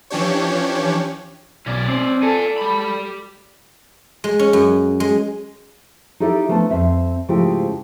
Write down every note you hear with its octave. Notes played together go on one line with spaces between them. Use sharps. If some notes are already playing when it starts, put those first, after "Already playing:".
E3 F3 C#4 D4 G4 C#5
B1 C#4 D5
C4
A4 D5 G#5
G4 B5
G#3
C#4
F#2
G#3
D#4 E4 G4 A4 D5 E5
F3 A3 B3 D4 A5
F2 C4 E5
G#2 C#3 F3 A3 E4 G4